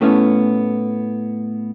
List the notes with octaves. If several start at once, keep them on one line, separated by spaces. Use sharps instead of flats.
A2 A3 B3 C#4 E4